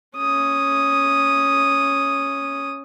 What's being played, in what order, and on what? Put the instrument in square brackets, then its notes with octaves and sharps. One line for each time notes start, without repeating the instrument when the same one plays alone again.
[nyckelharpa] C#4 D#6